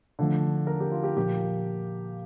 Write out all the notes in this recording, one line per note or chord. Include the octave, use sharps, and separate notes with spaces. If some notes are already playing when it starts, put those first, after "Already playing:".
D3 F3 A3
A#4
G4
F4
G4
A#2 F3 A#3 G4